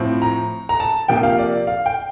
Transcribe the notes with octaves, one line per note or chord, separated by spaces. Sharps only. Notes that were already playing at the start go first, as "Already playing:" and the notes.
Already playing: A2 F3 C4
A#5
A#5
A5
C3 F3 A#3 G5
F5
D5
F5
G5